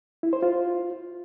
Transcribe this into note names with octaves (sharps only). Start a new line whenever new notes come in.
E4
C5
F4